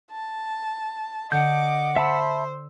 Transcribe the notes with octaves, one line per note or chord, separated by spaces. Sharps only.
A5
D3 D#5 F#5 D6 G6
C5 E5 A5 B5 E6